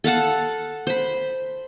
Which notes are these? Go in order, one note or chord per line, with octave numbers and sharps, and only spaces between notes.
A4 F5 F#5 A5
C5 B5